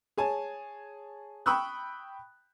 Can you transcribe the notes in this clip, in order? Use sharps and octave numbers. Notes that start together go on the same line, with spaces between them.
G#4 C#5 G#5 A5
G5 B5 C#6 D#6 E6 F#6